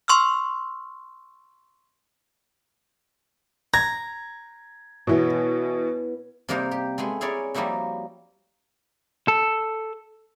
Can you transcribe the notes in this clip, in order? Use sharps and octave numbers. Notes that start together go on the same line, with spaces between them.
C6 C#6 E6 F6
A#5 G#6
B2 E3 B3 E4 C#5
C3 G3 A#3 D#4 A#4 C5
G4
G#3 A3 B3 G#4
E4 G#4 A#4 C#5 D5
F3 G3 A#3 D#4 E4 F#4
A4